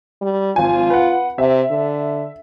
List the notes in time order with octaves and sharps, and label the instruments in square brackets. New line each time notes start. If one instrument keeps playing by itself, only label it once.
[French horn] G3
[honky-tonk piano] G#1 F3 G#5 [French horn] F4
[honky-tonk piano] B4 F#5
[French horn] C3 [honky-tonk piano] E5
[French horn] D3